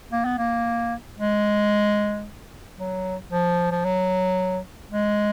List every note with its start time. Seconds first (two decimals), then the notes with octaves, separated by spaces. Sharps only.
0.13 A#3
0.25 B3
0.38 A#3
1.19 G#3
2.79 F#3
3.32 F3
3.72 F3
3.85 F#3
4.92 G#3